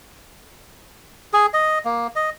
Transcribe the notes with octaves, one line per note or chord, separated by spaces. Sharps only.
G#4
D#5
A#3
D#5